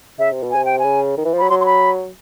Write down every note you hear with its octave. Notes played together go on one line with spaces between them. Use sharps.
C#3 E5
C3
B2
C3 G#5
G5
C#3 G#5
D#3
E3
F3
F#3 B5
F#3 C6
C6
B5